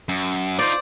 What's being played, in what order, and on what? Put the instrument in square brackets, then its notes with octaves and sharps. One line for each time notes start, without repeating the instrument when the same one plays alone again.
[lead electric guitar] F#2
[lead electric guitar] D#4 F4 [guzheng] C5 D5